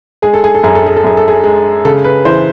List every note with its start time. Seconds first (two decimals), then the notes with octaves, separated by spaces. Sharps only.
0.22 G#3 G#4
0.34 A4
0.44 G#4
0.55 A4
0.63 F#2 G#4
0.75 A4
0.86 G#4
0.97 A4
1.04 F#2 G#4
1.17 A4
1.28 G#4
1.44 G#3
1.85 C#3 A4
2.04 B4
2.25 E3 C5